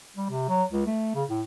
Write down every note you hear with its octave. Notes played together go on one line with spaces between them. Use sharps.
G3
C3
F#3
C#2
A3
C#3
A2